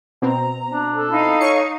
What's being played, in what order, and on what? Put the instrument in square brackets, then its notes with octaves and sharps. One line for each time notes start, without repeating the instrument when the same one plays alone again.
[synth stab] B2 C4 [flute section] A#5
[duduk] D4
[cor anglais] A4
[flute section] D#4 F5 [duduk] E4
[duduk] C#5 [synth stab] C#6 C#7